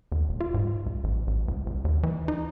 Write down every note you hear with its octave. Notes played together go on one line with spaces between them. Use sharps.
D#2
E1
F4
G#2
C#2
A1
A1
C#2
C#2
D#2
E3
D#4